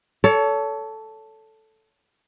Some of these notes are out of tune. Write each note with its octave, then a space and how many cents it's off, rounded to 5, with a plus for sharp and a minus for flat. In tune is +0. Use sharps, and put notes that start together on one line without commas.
A4 +0 C#5 +30